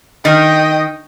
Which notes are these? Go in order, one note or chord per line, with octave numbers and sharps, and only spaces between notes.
D#3 D#5 G5